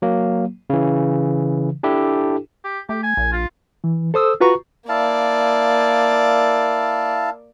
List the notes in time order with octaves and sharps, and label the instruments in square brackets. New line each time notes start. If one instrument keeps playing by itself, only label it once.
[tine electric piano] F#3 A#3
C#3 E3
D4 E4 G4 A4
[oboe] G4
[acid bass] A3 [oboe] G4
[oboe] G#5
[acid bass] A#1
[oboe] F4
[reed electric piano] E3
A4 C5 D#6 E6
F4 F#4 B4 A#5 C#6
[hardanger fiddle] A#3 D5 [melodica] E4 F5 A5